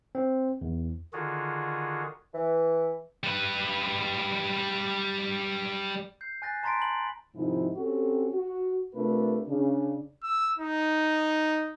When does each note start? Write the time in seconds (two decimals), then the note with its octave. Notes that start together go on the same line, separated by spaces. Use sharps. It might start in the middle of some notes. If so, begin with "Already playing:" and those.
0.15 C4
0.61 E2
1.13 D3 D#3 F4 F#4 G#4
2.34 E3
3.24 G3 B4
6.21 G6 C7
6.42 G#5 F#6 A6 A#6
6.63 A5 A#5 C6 A6 B6 D7
6.80 A5 B5 F#7
7.35 G#2 C3 D#3 F3 D#4 E4
7.75 C4 C#4 F#4 G4 A4
8.33 F#4
8.94 C3 A3 D4 F4 A#4 B4
9.47 C#3 D4
10.24 E6
10.59 D#4